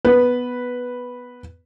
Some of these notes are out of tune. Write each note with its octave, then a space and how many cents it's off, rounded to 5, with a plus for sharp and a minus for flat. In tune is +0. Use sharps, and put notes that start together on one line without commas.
B3 +0 B4 -5